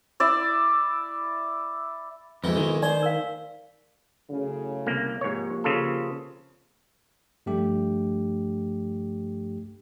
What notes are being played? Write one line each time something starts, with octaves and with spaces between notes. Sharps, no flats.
E4 D5 E5
B1 F2 G#2 E3 F4
D#3
D#4 C5 D5
A#4 F5
F#2 A2 C#3
C2 A#3
G#2 C3 F3 A#3 C#5
C#3 F4 A4
G2 F3 A3 D4 G4